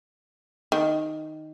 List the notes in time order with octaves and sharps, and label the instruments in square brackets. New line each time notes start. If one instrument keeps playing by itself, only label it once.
[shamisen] D#3